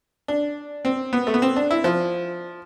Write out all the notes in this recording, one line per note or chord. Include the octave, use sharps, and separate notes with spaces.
D4
C4
B3
A3
B3
C4
D4
E4
F3